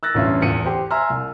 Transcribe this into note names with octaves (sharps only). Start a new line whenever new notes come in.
E6 F#6 A6 A#6
A1 E2 G2 C#4 F4 E5
D1 E2 C#7 D#7
G4 C5
E5 G#5 A#5 C6 E6 F6
C2